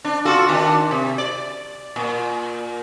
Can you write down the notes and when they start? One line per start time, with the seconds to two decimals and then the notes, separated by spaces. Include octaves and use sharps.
0.05 D4
0.25 F4 F#4 A4
0.48 D#3 D4
0.91 C3
1.18 D5
1.96 A#2